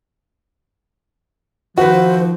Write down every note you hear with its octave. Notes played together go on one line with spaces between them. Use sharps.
D#3 F3 F#4 B4 C5